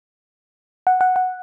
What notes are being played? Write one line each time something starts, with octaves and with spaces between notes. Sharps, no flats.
F#5
F#5
F#5